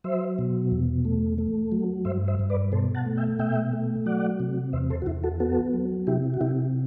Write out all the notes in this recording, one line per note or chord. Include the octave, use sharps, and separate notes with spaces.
F#3 C5 E5
B2
E2
A3
A3
F#3
G2 C5 E5
C5 E5
G2
B4 D5
B2 A4 C5
F#5 A5
A3
E5 G5
B2 E5 G5
A3
F#3 D5 F#5
C3
E2 C5 E5
A4 C5
F#4
E2 E4
F#4 A4
B3 F#4 A4
F#3
C3 E4 G4
F#4
C3 E4 G4